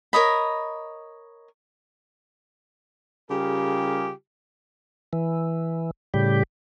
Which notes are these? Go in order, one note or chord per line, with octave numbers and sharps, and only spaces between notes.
A#4 C#5 D#5 B5
C#3 G3 F4 G4 G#4 A#4
E3
A2 C#3 G3 G4